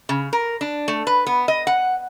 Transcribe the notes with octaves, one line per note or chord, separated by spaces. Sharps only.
C#3
A#4
D4
A3
B4
B3
D#5
F#5